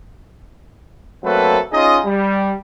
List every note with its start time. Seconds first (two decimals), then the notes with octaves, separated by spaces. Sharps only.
1.24 F#3 A3 A#3 C4 A4 B4
1.72 C#4 D#4 F4 G#4 D#5
2.06 G3